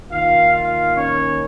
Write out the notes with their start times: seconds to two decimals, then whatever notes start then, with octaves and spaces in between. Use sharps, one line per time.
0.10 D#3 A#3 D#4 F4 F5
0.53 F4 F5
0.96 C#4 C#5